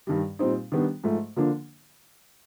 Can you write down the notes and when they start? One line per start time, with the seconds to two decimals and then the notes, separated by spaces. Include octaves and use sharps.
0.07 G2 D#3 G3
0.39 A#2 G3 C4 D#4
0.72 D#3 G3 B3 D4
1.04 G#2 F3 A3
1.36 D3 F3 A#3 D4